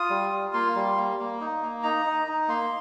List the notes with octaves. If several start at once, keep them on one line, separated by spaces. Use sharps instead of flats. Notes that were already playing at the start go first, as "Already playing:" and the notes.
Already playing: F4 D#6
G3
F4
A#3 C6
G3
A#3
A#3
D#4
A#3
D#4 A#5
D#4
D#4
A#3 C6